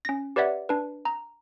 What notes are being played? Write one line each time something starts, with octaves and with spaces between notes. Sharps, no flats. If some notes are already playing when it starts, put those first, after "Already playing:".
C#4 A#6
G4 B4 C#5 D5 E5 F#5
D4 B4
A#5